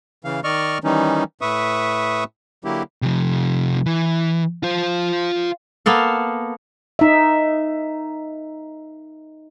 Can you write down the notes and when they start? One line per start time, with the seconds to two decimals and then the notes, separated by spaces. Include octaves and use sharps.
0.25 C#3 E3 F5
0.44 D#3 D5 D#5 C#6 F6
0.84 D#3 E3 G3 C#4 D#4
1.41 A2 B4 E5 C#6 D#6
2.64 D3 F#3 A#3 E4 G4
3.02 C3 F3
3.86 E3
4.63 F4 C5
5.86 A#3 B3 A4 F5
6.99 D#4 E5